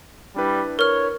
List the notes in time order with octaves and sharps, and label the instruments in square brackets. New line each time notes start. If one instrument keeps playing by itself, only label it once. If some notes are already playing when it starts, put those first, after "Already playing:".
[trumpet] G3 [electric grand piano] D4 E4 B4
[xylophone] A#4 F6 [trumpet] C#5